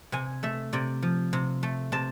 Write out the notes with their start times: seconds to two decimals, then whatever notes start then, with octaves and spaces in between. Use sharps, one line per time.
0.12 C3 G#5
0.43 A3 E5
0.73 C3 D5
1.02 F3
1.33 C3
1.63 A3
1.92 C3 A5